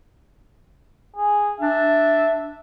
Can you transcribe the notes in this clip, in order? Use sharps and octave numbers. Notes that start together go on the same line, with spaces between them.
G#4
D4 E5